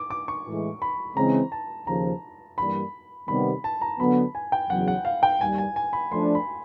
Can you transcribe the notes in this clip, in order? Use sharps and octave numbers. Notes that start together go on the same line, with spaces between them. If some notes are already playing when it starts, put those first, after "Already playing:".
Already playing: D6
D6
C#6
A2 E3 G#3
B5
C#3 E3 G#3 C4 A#5
A5
D#2 C#3 F3 A#5
G2 E3 G3 A#3 B5
C3 D#3 G3 B3 B5
A5
A#5
D3 F#3 B3 B5
G#5
G5
E2 C#3 F#3 F#5
F#5
F5
G5
D#2 D#3 G3 G#5
G#5
G#5
B5
F3 A3 D4 C6
B5